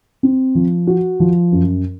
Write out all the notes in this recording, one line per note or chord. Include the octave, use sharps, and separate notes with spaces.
C4
F3
F#4
F3
F#2